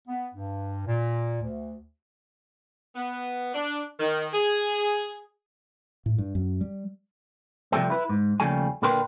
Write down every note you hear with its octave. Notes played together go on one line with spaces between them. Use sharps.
B3
G2
A#2
D2
B3
D4
D#3
G#4
A2
G2
F#2
G3
C3 F3 G3 A3 C4
E4 B4
G#2
D#2 C#3 F3 G3 A3 G#5
A#2 D3 A#4 B4 G5 C6